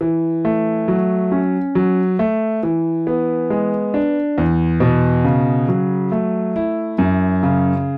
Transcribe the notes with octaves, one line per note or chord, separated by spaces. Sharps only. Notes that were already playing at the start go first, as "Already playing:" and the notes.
E3
A3
F#3
C#4
F#3
A3
E3
B3
G#3
D4
E2
B2
C#3
F#3
A3
E4
F#2
C#3